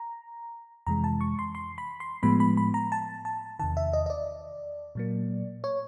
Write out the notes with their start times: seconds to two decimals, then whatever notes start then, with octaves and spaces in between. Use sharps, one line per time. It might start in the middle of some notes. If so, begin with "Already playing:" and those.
Already playing: A#5
0.87 F2 C3 E3 G#3 A#5
1.04 A5
1.21 C#6
1.39 C6
1.55 C6
1.78 B5
2.00 C6
2.23 A2 F3 G#3 B3 B5
2.40 B5
2.57 B5
2.74 A#5
2.92 A5
3.25 A5
3.59 E2 C3 D#3 A5
3.77 E5
3.93 D#5
4.06 D#5
4.10 D5
4.95 A#2 F#3 A#3
5.64 C#5